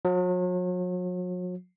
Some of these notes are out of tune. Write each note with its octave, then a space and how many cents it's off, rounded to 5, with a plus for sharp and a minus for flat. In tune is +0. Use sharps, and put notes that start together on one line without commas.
F#3 -40